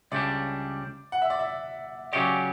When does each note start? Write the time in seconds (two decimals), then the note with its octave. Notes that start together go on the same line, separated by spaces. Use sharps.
0.12 C#2 C#3 G3 D4 D5
1.12 F#5
1.22 E5
1.30 D5
1.39 E5
2.13 C#3 F#3 C#4 G4 D5